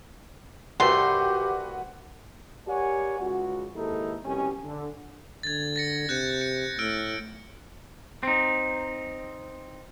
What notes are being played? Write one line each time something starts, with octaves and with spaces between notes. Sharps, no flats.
C2 G2 A3 F#4 G4 B4 C6
G4 A#4 C#5 D5 F#5 G#5
C#2 F#4
D#2 G#2 D#4 E4 A4
C2 F2 B2 C#4 G4 G#5
D3
D3 G#6 A6
A6 A#6 C#7
C3 F#6 G6 C#7
C#7
A2 E6 F6 D7
C4 D#4